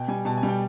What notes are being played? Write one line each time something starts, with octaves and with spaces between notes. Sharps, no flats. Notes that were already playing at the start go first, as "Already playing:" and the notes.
Already playing: B2 G5
G3 G#5
B2 A5
G#5
G3
G5